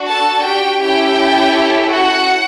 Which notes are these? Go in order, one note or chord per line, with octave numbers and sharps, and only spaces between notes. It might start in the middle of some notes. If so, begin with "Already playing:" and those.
Already playing: D4 F#4
A4 A5
G4 G5
C#4 E4 G4 A4 G5
F#4 F#5